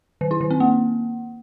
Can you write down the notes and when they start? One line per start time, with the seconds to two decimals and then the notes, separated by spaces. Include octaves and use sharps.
0.21 D#3
0.31 E4
0.41 D#3
0.50 C4
0.60 A#3